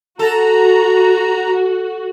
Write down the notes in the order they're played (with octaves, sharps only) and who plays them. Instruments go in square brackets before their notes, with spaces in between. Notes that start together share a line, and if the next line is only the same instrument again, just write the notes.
[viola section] F#4 [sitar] A4 [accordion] A#5